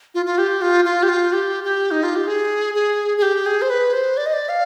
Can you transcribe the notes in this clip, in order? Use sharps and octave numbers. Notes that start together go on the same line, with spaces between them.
F4
F4
G4
F4
F4
G4
F4
G4
G4
D#4
F4
G4
G#4
G#4
G#4
G4
G#4
C5
B4
C5
D5
D#5
D5
F5